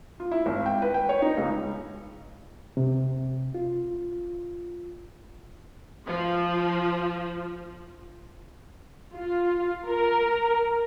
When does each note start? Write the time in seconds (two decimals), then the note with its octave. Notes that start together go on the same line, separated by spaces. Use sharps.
0.20 F4
0.31 E4
0.46 G#1
0.66 G5
0.82 B4
0.94 G5
1.09 C#5
1.22 D#4
1.37 C#2
2.77 C3
3.54 F4
6.05 F3
9.14 F4
9.87 A#4